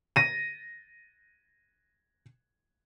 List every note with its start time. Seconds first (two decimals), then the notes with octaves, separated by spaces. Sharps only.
0.16 A#6 D#7